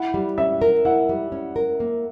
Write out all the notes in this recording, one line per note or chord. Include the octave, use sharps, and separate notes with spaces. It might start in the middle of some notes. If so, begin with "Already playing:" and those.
Already playing: E4 F#5
G3
C#4 E5
A#4
E4 F#5
G3
C#4
A#4
A#3